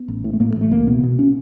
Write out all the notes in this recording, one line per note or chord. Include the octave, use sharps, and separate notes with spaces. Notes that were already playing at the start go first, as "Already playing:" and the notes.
Already playing: B3
A1
A2
A3
A2 A#3
A3
A1
A3
C#2 A#3
B2 B3
B2
C#4